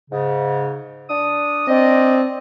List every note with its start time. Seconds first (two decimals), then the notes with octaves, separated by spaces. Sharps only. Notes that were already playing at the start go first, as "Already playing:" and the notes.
0.11 G#2 C#3
1.09 D4 D#6
1.68 C4 D4 D5 D#5